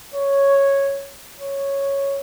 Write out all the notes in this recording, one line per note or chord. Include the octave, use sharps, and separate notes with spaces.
C#5
C#5